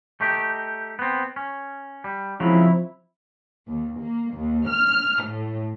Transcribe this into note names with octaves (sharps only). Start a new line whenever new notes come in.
A3 D#4 G4
B3 C4
C#4
G3
C#3 F3 F#3 G#3 C4 E4
D#2
A#3
D#2
F6
A2